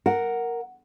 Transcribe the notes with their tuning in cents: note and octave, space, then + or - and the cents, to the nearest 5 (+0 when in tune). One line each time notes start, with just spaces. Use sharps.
A#4 +0 F#5 +0